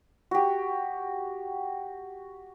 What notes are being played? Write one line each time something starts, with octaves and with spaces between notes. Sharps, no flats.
F#4 G4